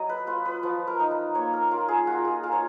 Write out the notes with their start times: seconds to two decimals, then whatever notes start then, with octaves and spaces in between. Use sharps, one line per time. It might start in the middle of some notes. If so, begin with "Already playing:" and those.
Already playing: F#3 D#5
0.09 B4
0.27 F4 B4
0.45 B4
0.63 F3 B4
0.87 A#4
1.00 D#4
1.11 B4
1.35 A#3 C#5
1.54 A#4
1.71 F4 A#4
1.88 G#4
2.07 F4 F#4
2.25 G#4
2.43 F4 A#4
2.52 C#5